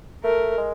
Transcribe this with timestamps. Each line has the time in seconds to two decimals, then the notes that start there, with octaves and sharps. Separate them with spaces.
0.24 A3 A#4
0.58 G#3